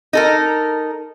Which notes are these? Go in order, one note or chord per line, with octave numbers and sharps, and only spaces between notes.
D#4 A4 A#4